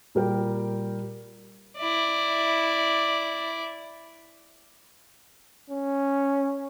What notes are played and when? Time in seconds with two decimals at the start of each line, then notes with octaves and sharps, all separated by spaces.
0.15 A#2 G3 A#4 G5
1.78 E4 D5
5.70 C#4